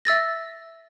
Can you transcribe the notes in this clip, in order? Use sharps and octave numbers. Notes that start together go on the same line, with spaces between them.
E5 E6 A6 A#6